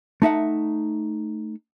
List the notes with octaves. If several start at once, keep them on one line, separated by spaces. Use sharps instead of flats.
A3 D#4 E5 F#5